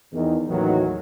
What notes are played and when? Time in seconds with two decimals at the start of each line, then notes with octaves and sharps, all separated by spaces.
0.13 E2 D#3
0.48 A1 D#2 D#3 E3 F#3